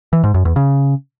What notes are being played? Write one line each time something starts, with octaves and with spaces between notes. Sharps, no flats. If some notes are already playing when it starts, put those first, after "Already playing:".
E3
G#2
F#2
E2
C#3